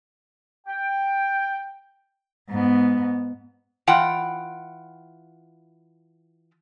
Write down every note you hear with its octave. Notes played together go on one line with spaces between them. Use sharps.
G5
G#2 B3
E3 F4 F#5 G5